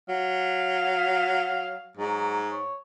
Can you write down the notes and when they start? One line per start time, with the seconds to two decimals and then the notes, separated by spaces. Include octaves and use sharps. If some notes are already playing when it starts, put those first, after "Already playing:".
0.09 F#3 F5
1.97 G#2 F#3
2.52 C#5